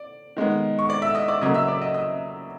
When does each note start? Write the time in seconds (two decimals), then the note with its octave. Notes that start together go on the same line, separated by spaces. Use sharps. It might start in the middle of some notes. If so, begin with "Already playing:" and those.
Already playing: D5
0.37 D#3 G#3 B3
0.79 C#6
0.89 D5 D6
1.02 E5 E6
1.15 D#5 D#6
1.28 D5 D6
1.41 C#3 F#3 A#3 D#5 D#6
1.54 E5 E6
1.67 D5 D6
1.82 D#5 D#6
1.94 D#5 D#6